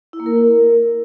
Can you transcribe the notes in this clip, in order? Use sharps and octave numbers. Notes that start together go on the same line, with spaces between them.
E4
A#3
A#4